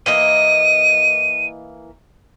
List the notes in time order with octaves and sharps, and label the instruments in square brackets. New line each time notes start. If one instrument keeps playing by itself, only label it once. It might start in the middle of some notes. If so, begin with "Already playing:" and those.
[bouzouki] E3 A#3 D#5 [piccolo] D#7